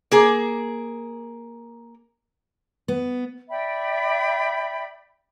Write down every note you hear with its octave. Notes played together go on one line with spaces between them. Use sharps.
A#3 G#4
B3
D5 E5 G5 B5